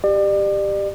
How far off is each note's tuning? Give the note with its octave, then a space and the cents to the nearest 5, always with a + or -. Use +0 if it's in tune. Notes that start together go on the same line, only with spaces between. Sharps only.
G4 +10 D5 +35